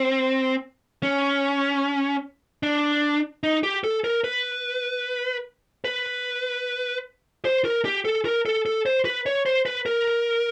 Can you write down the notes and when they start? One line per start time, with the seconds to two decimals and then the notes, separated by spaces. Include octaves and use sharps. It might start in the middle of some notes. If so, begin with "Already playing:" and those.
Already playing: C4
1.03 C#4
2.63 D4
3.43 D#4
3.63 G4
3.84 A4
4.04 A#4
4.24 B4
5.84 B4
7.45 C5
7.65 A#4
7.85 G4
8.05 A4
8.25 A#4
8.46 A4
8.66 A4
8.86 C5
9.05 B4
9.26 C#5
9.46 C5
9.66 B4
9.86 A#4